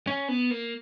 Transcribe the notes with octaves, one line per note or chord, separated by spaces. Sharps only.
C#4
B3
A#3